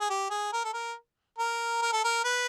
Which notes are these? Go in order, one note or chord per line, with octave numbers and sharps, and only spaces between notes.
G#4
G4
G#4
A#4
A4
A#4
A#4
A#4
A4
A#4
B4